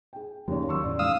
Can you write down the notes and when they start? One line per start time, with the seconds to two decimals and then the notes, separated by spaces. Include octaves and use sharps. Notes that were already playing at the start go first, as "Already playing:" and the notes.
0.13 G#4 G5
0.48 D#2 C#3 F3 A#3 C#5
0.69 D#3 F#3 C6 C#6 E6
0.84 E2 A2 C#3 D5
0.99 G#2 F5 D#6 E6